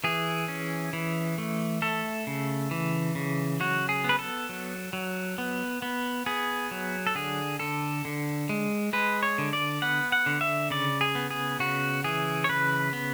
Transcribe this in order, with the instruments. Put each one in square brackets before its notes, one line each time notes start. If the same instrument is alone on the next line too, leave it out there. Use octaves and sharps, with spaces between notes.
[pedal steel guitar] E3 G#4
C#4
E3
A3
A3 A4
C#3
E3
C#3
F#3 F#4
G#4
B3
B4
A4
F#3
F#3
B3
B3
B3 G#4
F#3
A4
D3 G#4
D3 A4
D3
G#3
G#3 B4
C#5
D3
D5
B3 F#5
F#5
D3
E5
C#3 D5
G#4
B3
G#4
C#3 F#4
E3 G#4
C#5
C#3 B4
B3